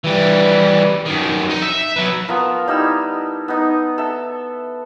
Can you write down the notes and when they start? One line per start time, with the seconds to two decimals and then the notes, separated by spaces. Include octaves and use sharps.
0.04 E3 G3
1.06 F#2 D#3
1.50 D#4
1.62 E5
1.96 F#3 B4
2.28 B3 F4 A4 A#4
2.68 G3 D#4 E4 E6
3.48 B3 D#4
3.98 A4 E5